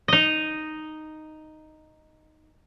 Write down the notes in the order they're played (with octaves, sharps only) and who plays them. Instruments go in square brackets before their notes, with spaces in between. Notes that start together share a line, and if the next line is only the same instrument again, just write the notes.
[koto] D#4 D#5